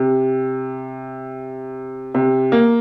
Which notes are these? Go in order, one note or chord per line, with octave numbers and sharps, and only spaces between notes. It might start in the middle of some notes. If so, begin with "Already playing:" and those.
Already playing: C3
C3
A#3